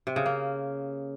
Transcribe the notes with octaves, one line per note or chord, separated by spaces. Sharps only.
C3
C#3
A#3